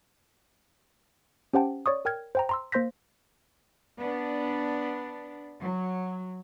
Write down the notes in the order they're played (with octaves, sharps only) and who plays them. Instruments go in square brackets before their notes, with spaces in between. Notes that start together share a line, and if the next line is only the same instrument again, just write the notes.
[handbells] C#4 G4 C5 F#5 G5 A5
C#5 D5 C#6 D#6
A#4 G5 F6 G#6
C5 G5 A#5
A#5 C6 E6
A#3 C5 C6 G6 A#6 B6
[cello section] B3 D4
F#3